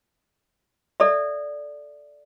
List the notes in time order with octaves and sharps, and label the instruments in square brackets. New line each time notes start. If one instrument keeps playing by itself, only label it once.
[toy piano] A4 D5 E5